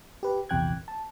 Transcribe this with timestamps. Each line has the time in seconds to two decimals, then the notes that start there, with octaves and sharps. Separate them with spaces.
0.23 G4 B4
0.49 A#1 E2 C3 G5 F#6 G#6
0.88 A5